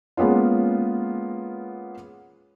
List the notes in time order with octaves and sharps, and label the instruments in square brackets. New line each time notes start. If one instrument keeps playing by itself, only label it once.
[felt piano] G#3 A#3 B3 C#4 F4